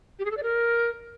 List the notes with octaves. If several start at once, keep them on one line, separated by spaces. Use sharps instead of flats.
G4
G#4
A4
D5
A#4